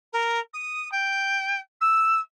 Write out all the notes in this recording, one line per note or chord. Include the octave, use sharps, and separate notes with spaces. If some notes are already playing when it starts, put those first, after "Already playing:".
A#4
D#6
G5
E6